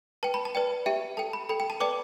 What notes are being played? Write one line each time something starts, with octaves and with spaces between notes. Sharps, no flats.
B4 G5 A5
B5
A5
B4 D5 G5
G4 E5 G5
A4 G5 A5
B5
A4 G5 B5
G5
A5
B4 D5 G5 D6